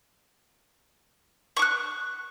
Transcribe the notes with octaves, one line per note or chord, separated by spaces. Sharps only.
C#6 D6 F#6